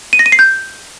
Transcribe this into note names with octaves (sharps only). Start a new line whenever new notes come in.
D#7
A#6
D#7
C7
G6